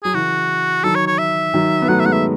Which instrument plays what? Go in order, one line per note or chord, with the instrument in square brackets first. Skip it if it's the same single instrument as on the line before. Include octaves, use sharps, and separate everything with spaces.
[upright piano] F#3 [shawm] G#4
[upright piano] C#3 E3 [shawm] F#4
[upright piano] D#3 F#3 [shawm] A4
[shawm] C#5
C#5
E5
[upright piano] D#3 F#3
B3
[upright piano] F#3 A3 [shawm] F#5
[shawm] E5
[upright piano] G#3 B3 [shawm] F#5
[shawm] E5